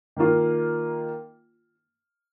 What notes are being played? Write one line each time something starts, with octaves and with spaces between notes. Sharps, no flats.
D#3 A#3 F4